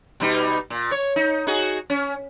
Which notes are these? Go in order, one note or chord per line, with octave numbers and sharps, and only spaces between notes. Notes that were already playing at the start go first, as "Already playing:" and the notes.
B2 G3 D#4
A#2
C#5
D#4
D#4 F#4 G#4
C#4